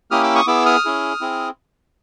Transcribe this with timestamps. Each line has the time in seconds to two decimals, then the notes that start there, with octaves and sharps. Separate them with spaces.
0.11 A#3 C#4 E4 G4 D#6 F6
0.23 D6 E6
0.35 C#6 D#6
0.47 B3 E4 G#4 D6 E6
0.66 D#6 F6
0.85 C#4 E4 G#4
1.21 C4 E4 G#4